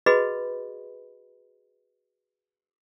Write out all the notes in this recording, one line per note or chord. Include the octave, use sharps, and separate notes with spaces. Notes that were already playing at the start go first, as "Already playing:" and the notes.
F#4 G#4 B4 D#5 B5